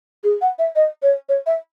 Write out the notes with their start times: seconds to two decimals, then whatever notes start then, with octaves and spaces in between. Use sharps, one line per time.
0.23 G#4
0.41 F#5
0.59 E5
0.75 D#5
1.02 C#5
1.29 C#5
1.46 E5